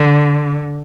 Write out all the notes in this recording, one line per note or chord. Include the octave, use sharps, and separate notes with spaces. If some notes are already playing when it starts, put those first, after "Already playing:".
Already playing: D3